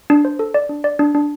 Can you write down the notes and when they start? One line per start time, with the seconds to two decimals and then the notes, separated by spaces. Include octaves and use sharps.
0.10 D4
0.25 C5
0.39 A4
0.54 D5
0.69 D4
0.84 D5
0.99 D4
1.14 D4